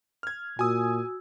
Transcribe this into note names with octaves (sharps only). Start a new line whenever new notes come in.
F6 G#6
A#2 F#4 G#5 D#6 E6